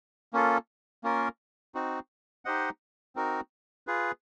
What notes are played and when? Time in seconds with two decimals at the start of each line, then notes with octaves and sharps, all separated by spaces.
0.33 A#3 C#4 F4 A4
1.04 A#3 C#4 F4 A#4
1.75 C4 D#4 F#4
2.45 D#4 G4 C5 D#5 F#5
3.16 C4 D#4 F#4 A#4
3.87 F4 G#4 B4